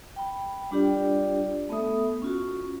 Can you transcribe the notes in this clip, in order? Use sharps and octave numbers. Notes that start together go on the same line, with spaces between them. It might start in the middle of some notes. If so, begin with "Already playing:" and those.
G5 B5
G3 D4 F4 G4 D5
A3 B3 A4 E5 D#6
C#4 F4 F#4